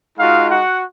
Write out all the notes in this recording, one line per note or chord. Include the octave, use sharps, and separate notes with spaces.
G#3 D#4 F4 F#4 F5
F#4 F#5